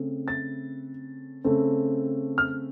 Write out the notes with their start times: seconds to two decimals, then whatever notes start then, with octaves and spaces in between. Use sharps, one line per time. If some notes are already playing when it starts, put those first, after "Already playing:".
Already playing: C#3 A3 C4
0.28 A6
1.44 C#3 A3 C4
2.38 F6